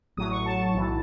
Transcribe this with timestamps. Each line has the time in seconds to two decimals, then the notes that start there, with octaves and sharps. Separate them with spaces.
0.17 A1 A2 F#3 D#6
0.32 C#6
0.46 A5
0.75 B1 A2 E3